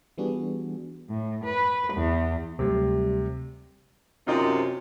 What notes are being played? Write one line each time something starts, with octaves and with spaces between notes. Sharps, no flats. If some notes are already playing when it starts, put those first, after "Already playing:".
E3 G3 B3 D4 F#4 G#4
A2
B4
E2
D2 C3 F#3 G3 A3
F#2 C3 D#4 F4 D#5